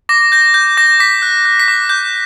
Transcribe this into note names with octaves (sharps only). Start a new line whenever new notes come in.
D6 A#6
G6 A#6
G6
D6 A#6
D6 B6
F#6
F#6
B6
D6
D6 G6